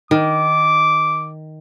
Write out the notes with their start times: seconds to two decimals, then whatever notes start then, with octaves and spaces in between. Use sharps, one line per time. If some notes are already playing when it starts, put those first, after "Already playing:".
0.11 D#3 D6